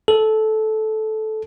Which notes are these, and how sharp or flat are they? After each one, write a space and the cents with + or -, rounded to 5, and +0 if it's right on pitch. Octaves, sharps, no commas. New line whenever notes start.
A4 -15